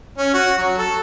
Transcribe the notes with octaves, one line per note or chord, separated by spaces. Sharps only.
C#4
F#4
F#3
A4